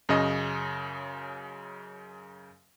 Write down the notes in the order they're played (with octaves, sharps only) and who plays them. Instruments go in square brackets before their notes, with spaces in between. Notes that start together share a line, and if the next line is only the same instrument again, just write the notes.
[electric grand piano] F#2 C#3 C#5 D#5